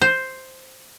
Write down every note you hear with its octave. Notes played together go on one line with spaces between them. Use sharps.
C5